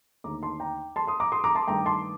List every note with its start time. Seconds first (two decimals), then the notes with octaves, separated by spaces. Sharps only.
0.24 D#2 D3 A3 A#5 D6
0.43 A5 C6
0.60 G5 A#5
0.96 A5 C6
1.07 C6 D#6
1.20 A#5 D6
1.32 C6 D#6
1.44 A#5 D6
1.55 A5 C6
1.67 G2 D#3 A3 D4 G5 A#5
1.86 A5 C6